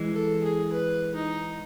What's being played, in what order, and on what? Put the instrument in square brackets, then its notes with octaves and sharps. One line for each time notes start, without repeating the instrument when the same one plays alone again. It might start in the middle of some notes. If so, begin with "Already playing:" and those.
Already playing: [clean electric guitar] E3 G#3
[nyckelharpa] A4
G#4
B4
D#4